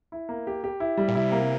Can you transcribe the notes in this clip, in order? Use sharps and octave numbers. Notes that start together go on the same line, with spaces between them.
E4
A#3
G4
G4
E4
G3
A#2
C3 E4
A#3